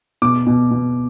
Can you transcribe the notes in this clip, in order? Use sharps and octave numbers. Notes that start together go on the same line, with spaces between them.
B2 D6
B2
B2